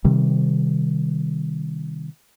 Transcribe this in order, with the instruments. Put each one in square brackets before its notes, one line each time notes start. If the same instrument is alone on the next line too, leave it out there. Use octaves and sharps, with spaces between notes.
[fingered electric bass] C3 D#3 G3